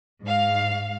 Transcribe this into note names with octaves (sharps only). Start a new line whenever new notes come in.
G#2 F5